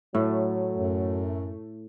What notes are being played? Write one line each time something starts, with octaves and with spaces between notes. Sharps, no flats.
A2 F#3 A3
F#2